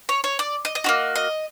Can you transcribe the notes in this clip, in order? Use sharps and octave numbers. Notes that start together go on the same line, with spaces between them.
C#5
C#5
D5
D#5
D#5
A#3 C#4 F#4
D#5